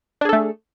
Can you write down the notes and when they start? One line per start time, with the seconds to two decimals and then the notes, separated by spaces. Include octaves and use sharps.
0.21 D4
0.25 G#4
0.29 A4
0.33 A3